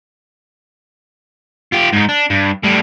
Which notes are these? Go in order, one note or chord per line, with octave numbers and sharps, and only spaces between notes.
F4 G4
G#2 D#4
D4
G2
A2 G3